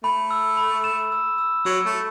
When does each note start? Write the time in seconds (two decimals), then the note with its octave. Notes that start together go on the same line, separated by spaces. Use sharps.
0.03 A3 B5
0.31 E6
0.57 B5
0.84 E7
1.12 E6
1.38 E6
1.65 F#3 E6
1.86 A3
1.92 E6